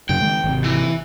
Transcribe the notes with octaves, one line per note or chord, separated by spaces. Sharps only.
F#2 C#3 G5
D#3 G#3
G#1 C3
E3